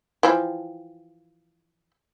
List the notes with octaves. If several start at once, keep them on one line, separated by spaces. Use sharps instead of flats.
E3 F3 G5